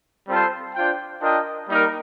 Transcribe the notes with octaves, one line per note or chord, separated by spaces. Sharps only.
G3 C4 F4 A4 C5
D4 F4 C5 G5
D4 F4 A#4 D#5 G5
G3 A#3 D#4 A#4